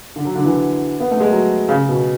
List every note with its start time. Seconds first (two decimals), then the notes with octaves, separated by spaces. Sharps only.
0.16 D3
0.25 F#3
0.35 D3
0.45 E3
1.00 B3
1.11 A3
1.20 G#3
1.31 F#3
1.69 C#3
1.89 B2